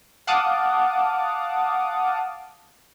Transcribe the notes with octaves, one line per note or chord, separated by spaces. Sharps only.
F5 F#5 A5 D6 D#6